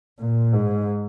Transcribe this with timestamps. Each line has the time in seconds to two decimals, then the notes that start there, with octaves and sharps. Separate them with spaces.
0.19 A#2
0.53 G#2